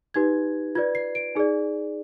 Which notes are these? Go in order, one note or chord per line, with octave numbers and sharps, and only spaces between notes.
D#4 G4 B4 G#6
F4 B4 D5 G#6
C7
D7
D#4 G#4 D5